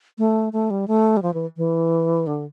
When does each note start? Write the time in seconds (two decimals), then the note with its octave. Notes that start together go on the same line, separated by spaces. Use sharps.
0.18 A3
0.53 A3
0.70 G3
0.88 A3
1.17 G3
1.22 F3
1.34 E3
1.57 E3
2.27 D3